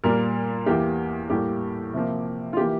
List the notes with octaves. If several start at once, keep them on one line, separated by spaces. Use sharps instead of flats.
A#2 G3 A#3 A#4
E2 E3 A#3 G4
A2 G3 A#3 G4
C3 F3 A#3
F4
E3 A#3 G4